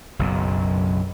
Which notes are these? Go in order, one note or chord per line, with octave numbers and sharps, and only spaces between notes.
F#1 B1 F#2